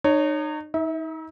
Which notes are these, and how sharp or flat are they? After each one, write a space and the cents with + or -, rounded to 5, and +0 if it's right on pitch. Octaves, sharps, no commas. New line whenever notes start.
D#4 -35 C#5 +0
D#4 +35 E5 -25